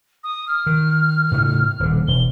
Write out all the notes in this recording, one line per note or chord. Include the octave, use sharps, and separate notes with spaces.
D#6
F6
D#3
A2 C#3 A3
D#1 D3
E1 G7